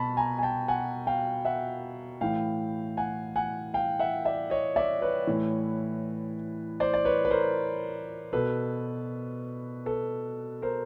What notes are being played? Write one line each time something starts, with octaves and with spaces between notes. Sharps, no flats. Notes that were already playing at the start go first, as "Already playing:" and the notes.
Already playing: B2 A5 B5
G#5 A#5
G#5
G5 A5
F#5 G#5
F5 G5
E5 F#5
A2 E3 F5 G5
F#5 G#5
F#5 G#5
F5 G5
E5 F#5
D5 E5
C#5 D#5
D5 E5
B4 C#5
A2 E3
C5 D5
D5
B4 C#5
B4
A#4 C5
B2 A4 B4
A4 B4
A#4 C5